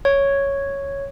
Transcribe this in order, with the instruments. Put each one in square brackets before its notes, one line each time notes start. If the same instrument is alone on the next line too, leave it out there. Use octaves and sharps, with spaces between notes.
[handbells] C#5